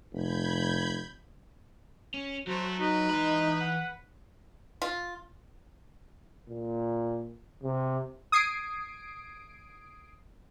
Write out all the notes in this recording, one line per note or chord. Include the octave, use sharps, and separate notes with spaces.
F1 B5 G6 G#6
C#4
F#3 A3 F#4 C5
D#4 F#4 B4
E3 G#3 B5
F#5
F4
A#2
C3
D#6 G#6 C7 D7